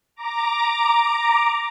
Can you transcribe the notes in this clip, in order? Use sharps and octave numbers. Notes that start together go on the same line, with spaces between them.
A#5 D6